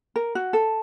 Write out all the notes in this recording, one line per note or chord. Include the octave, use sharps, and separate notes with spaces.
A#4
F#4
A4